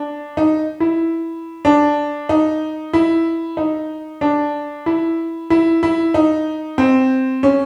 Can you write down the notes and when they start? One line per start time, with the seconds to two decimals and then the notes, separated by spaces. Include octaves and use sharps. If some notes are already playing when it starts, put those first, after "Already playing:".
Already playing: D4
0.37 D#4
0.80 E4
1.65 D4
2.29 D#4
2.93 E4
3.57 D#4
4.21 D4
4.86 E4
5.50 E4
5.83 E4
6.14 D#4
6.78 C4
7.43 C#4